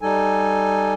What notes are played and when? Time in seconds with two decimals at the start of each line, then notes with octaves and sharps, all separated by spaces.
0.01 G3 D#4 A4 G#5